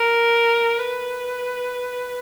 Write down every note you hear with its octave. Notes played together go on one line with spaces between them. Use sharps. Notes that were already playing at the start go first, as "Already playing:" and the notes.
Already playing: A#4
B4